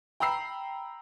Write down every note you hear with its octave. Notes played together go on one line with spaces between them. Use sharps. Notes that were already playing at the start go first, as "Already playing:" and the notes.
G5 A#5 B5 E6 C7